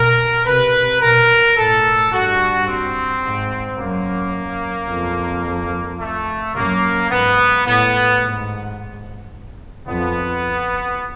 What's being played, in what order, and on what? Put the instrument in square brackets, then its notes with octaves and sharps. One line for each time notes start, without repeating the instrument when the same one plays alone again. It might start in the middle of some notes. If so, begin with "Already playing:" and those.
Already playing: [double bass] B2 [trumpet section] A#4
[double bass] C3 [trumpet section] B4
[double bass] B2 [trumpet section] A#4
[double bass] A2 [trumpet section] A4
[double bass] G2 [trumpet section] F#4
[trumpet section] C4
[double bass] G#2
[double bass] F#2 [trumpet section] A#3
[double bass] F2
[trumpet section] A3
[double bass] F#2 [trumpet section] A#3
[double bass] G#2 [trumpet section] B3
[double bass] A2 [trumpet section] B3
[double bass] G#2
[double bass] F2 [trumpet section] B3